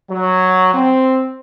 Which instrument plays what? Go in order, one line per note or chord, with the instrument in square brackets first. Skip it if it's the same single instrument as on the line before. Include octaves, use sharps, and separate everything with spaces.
[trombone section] F#3
C4